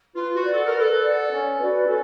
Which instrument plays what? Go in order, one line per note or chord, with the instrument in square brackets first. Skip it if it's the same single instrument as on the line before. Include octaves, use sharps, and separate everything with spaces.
[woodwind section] F4 [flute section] B4
[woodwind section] F#4
[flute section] D5 F#5
[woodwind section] A4
A#4
[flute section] B4
[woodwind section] A4
[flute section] D5 F#5
C#4
F#4 B4 D5
[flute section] C#4 [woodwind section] A4